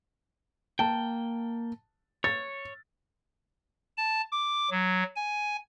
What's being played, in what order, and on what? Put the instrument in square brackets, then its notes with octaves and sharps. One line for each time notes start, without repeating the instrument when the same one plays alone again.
[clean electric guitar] A#3 G5 [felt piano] A5
[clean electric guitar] C#5 [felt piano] A6
[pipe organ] A5
D6
F#3
G#5